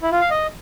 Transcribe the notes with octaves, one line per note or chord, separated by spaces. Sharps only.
E4
F4
F5
D#5